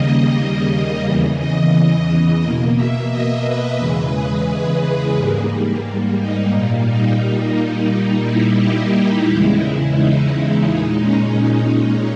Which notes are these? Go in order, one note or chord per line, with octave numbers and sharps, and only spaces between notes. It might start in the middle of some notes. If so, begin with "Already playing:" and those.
Already playing: D#2 C#3 G3 A#3 D#5
D#5
E2 C#3 E3
D#5
B2 A#3
E5
D#5
B4
E2 C#3 E3 G#3 B4
G#4
G#2 G3 A#3
D#4
A#2 G3 A#3
D#4
A#2 G3 A#3 D#4
E4
G4
E2 C#3 G#3 E4
D#4
A#2 G#3 D#4
C#4